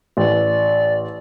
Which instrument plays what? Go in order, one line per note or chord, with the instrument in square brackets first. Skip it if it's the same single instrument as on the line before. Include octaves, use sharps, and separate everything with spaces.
[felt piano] A1 [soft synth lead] D5